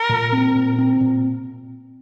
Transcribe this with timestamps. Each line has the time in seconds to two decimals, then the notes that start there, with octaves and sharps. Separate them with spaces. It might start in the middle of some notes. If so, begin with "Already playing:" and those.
Already playing: A#4
0.09 A#2
0.32 C4
0.55 A#2
0.78 C4
1.01 A#2